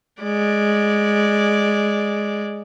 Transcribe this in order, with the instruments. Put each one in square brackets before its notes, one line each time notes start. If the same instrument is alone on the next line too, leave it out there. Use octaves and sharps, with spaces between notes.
[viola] G#3 D5